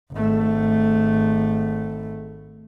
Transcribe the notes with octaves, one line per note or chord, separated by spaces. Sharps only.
G#1 A3